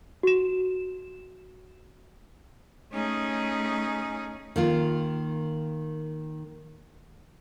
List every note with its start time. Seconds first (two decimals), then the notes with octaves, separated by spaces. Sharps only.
0.23 F#4 E7
2.91 A3 C#4 D#4 G#4
4.56 D#3 A#3 F4